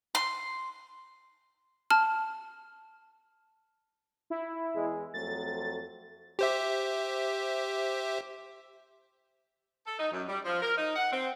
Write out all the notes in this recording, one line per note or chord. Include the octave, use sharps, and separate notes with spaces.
C6
A5 F6
E4
E2 G#3
F2 F#3 A3 A6
G4 C5 E5
A4
D#4
F#2
G3
F3
A#4
D#4
F#5
C4